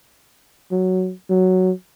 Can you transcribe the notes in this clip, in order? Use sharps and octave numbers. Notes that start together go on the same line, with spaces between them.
F#3
F#3